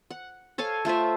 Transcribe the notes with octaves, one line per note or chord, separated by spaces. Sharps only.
F#5
A4 C#5 F5 G#5
A3 F4 C5 E5